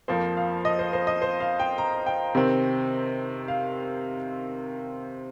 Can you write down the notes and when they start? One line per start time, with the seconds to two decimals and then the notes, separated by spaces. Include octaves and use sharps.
0.08 F2 F3 A#3 C5
0.37 F5
0.65 D#5
0.79 C5
0.93 C5
1.07 D#5
1.22 C5
1.40 F5
1.60 G5
1.78 A#5
2.06 G5
2.35 C3 D#3 C4
3.48 F5